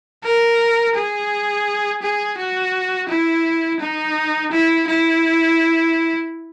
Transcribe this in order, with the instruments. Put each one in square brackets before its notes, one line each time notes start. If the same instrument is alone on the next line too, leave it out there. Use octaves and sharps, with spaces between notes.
[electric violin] A#4
G#4
G#4
F#4
E4
D#4
E4
E4